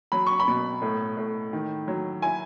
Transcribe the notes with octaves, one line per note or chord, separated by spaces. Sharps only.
F#3 B5
C#6
B5
B2
A2
A2
D#3
F#3
E4 G#5